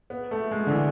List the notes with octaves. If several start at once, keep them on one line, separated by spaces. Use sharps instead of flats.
B3
A3
G#3
D3
E3